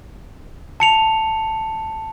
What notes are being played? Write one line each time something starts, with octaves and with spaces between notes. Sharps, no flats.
A5 C#7 F7